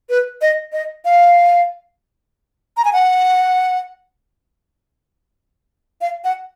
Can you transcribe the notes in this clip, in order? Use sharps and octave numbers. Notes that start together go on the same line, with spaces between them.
B4
D#5
D#5
F5
A#5
G#5
F#5
F5
F#5